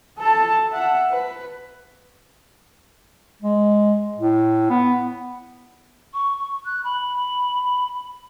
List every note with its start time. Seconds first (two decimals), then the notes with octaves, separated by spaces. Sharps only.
0.18 A4 A5
0.71 E5 F#5
1.11 B4
3.42 G#3
4.16 A2
4.70 B3
6.13 C#6
6.65 F#6
6.83 B5